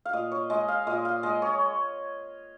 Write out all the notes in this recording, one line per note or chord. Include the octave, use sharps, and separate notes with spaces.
F5
A#2 D#5
C#5
G#3 D#5
F5
A#2 D#5
F5
G#3 D#5
C#5